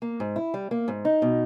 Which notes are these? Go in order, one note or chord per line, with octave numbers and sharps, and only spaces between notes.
A#3
G#2
E4
G3
A#3
G#2
D#4
B2